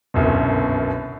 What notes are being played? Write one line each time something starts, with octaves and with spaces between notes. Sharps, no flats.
G1 C2 F#2 B2